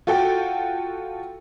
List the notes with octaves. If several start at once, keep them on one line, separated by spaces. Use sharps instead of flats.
F4 F#4 A4 G5